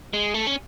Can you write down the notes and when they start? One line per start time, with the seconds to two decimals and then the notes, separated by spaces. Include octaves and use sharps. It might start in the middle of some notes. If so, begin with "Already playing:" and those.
0.13 G#3
0.34 A3
0.47 C#4